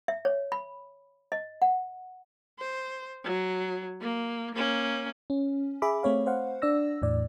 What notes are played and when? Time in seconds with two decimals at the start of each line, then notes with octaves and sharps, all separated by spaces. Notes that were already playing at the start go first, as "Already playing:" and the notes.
0.08 E5
0.25 C#5
0.52 B5
1.32 D#5
1.62 F#5
2.59 C5
3.24 F#3
4.01 A#3
4.55 A#3 C#4
5.30 C#4
5.82 G#4 E5 B5 D6
6.03 A3 C4 C#5 F5
6.26 C5 F5 F#5
6.62 D4 D5 E6 A#6
7.02 E2 A2 D5